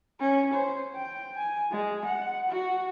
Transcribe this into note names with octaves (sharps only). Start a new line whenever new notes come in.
C#4
C5
G5
G#5
G#3
F#5
F#4